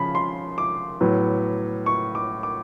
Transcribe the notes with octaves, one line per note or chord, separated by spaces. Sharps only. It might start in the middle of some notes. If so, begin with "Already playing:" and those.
Already playing: C#3 F3 B5
C6
D6
A2 F#3 B3
C#6
D6
D6